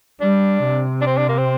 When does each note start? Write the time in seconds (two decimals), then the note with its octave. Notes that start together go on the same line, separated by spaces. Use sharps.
0.21 G3 D4
0.64 C3
1.01 D4
1.07 C4
1.17 D4
1.29 A#3
1.38 C4